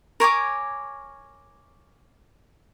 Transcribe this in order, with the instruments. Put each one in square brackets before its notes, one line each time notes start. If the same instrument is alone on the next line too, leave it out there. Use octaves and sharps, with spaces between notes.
[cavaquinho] A#4 C#5 G#5 D6